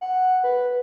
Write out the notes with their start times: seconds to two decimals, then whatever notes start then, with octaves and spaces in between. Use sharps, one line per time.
0.01 F#5
0.44 B4